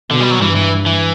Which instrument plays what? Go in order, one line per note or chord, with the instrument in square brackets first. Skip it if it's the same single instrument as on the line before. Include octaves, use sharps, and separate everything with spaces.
[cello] B2 [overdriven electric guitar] D3
[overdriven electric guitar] G3
F#3
[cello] G2 [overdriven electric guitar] E3
[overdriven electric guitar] E3
E3